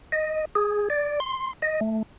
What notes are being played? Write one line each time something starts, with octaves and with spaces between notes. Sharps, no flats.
D#5
G#4
D5
C6
D#5
A3